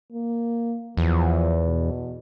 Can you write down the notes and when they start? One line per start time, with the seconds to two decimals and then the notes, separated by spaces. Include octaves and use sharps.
0.12 A#3
0.97 E2 F3
1.66 B2